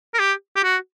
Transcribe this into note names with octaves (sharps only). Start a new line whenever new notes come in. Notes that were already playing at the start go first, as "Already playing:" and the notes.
A#4
G4
G4
F#4